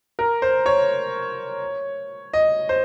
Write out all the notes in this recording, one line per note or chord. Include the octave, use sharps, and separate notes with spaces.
A#4
C5
C#5
D#5
C5